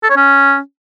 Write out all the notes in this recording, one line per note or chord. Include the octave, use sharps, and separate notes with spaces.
A4
C#5
C#4